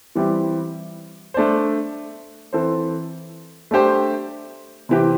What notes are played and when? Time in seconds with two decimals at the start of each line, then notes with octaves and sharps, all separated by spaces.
0.15 E3 G3 C4 E4 G4
1.34 A3 D4 C5
2.53 E3 C4 A4 C5
3.71 A3 D4 G4 C5
4.89 C3 E3 C4 G4